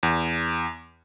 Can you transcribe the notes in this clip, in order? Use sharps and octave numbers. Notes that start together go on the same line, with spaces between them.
E2